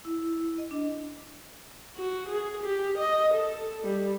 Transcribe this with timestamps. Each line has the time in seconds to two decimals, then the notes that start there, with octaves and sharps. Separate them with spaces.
0.05 E4
0.58 D#5
0.71 D4
1.96 F#4
2.29 G#4
2.63 G4
2.98 D#5
3.34 A4
3.83 G3